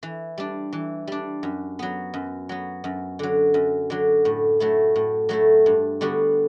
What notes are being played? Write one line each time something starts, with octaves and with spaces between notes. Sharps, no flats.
E3
G3 D4
E3
G3 D4
F#2
F#3 B3
F#2
F#3 B3
F#2
D3 F#3
F#2
D3 F#3
A2
F#3 A3 E4
A2
F#3 A3 E4
G2
D3 G3 B3 F#4